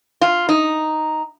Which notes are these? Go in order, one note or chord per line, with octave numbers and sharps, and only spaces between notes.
F4
D#4